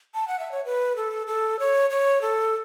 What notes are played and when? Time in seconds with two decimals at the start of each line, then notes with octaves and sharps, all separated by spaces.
0.14 A5
0.28 F#5
0.39 E5
0.52 C#5
0.65 B4
0.96 A4
1.27 A4
1.59 C#5
1.90 C#5
2.22 A4